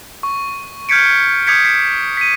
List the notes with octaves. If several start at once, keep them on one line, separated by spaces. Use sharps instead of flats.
C#6
F6 G6 G#6 B6 C#7 D7
D6 D#6 G6 G#6 B6 C#7
B6 C7
B6 D#7